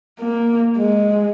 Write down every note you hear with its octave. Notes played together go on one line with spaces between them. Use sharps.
A#3
G#3